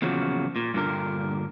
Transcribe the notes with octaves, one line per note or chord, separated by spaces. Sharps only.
E2 A#2 C#3 F3 F#3
A#2
G2 A#2 D3 A#4